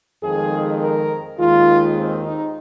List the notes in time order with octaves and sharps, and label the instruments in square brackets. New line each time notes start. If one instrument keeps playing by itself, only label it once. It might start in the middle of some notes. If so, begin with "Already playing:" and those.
[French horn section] F2 D#3 G#3 G#4
A#4
D#2 D#3 G#3 F4
C4
D#4